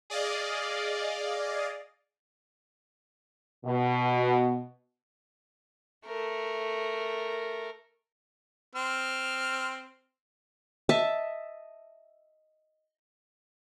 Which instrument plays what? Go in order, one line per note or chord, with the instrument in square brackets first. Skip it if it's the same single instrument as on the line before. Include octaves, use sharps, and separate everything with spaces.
[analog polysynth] G#4 D5 D#5 F5
[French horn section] B2
[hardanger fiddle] A3 A#4
[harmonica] C4 F6
[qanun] D#5 E5 A5